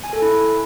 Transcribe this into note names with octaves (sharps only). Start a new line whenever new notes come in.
G#5
A4
E4